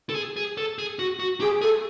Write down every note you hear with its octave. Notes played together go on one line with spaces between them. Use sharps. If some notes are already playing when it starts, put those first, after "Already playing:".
A4
G#4
G#4
A4
G#4
F#4
F#4
G4 G#4
G#4 A4